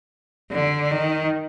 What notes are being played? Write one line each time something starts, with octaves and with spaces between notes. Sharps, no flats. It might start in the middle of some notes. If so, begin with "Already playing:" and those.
D3
D#3